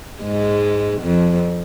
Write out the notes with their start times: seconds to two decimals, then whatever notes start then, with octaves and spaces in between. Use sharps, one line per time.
0.22 G#2 G#3
1.01 F2 F3